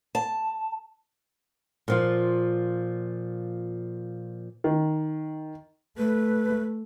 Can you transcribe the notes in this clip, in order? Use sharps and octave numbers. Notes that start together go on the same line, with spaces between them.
A5
A#2 F3 F4
D#3
A3 B4